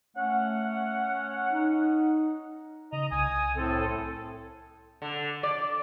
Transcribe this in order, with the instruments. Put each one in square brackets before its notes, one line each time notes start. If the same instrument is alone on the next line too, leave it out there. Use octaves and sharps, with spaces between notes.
[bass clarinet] A3 [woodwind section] C#4 F#5
[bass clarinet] D#4
[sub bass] C#3 [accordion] D#5 A#5
[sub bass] C2 [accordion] G#5 D#6
[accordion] A2 C4 A4
[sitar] D3
D5